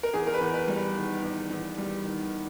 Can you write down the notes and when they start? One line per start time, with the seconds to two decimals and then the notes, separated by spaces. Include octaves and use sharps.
0.03 A#4
0.13 E2 G#4
0.27 A#4
0.34 B4
0.40 E2
0.54 B4
0.68 G3
0.75 B4
0.95 D#3
1.23 E2
1.50 E2
1.78 G3
2.04 D#3